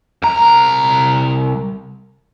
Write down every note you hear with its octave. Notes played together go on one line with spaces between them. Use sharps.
C2 A#5